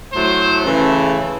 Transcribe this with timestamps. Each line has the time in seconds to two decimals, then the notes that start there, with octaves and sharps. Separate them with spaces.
0.12 A2 F#3 A3 C5
0.64 C#3 E3 A3